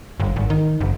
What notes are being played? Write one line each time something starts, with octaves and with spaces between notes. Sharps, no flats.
G1
G#1
D#3
F#1